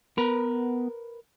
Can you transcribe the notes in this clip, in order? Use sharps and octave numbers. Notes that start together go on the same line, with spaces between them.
B3 A#4 B4